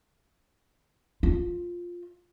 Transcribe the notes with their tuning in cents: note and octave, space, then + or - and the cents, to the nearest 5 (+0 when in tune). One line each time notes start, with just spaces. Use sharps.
F4 +5